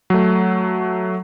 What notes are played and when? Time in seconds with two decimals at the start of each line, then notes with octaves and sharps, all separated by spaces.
0.10 F#3 A3